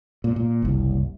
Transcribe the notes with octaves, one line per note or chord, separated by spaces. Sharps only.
A#2
A#2
F#1 C2